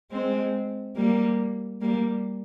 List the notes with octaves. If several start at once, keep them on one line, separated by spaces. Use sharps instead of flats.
G#3 C4
G3 A#3
G3 A#3